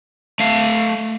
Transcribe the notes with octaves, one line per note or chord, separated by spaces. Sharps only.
A3 F5